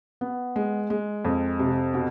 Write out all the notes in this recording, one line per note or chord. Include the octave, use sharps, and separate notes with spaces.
B3
G#3
G#3
F2
C3
B2